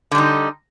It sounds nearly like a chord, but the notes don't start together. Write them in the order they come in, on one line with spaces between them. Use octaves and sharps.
D3 G3 D#4